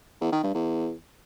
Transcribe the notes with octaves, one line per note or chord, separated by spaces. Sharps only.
E2
D#3
G2
E2